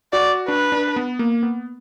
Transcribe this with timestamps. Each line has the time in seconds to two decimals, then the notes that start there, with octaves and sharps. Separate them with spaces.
0.13 F#4 D5
0.48 D4 B4
0.72 D4
0.96 B3
1.19 A#3
1.43 B3